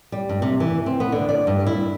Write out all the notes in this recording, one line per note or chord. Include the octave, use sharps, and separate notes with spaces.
G3
G2
C3
E3
C4
B3
D3
D5
G2
E4